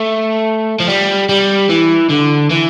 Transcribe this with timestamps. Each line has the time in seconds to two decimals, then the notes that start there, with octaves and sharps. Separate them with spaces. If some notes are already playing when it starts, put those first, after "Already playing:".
Already playing: A3
0.80 F3
0.88 G3
1.29 G3
1.70 E3
2.10 D3
2.51 E3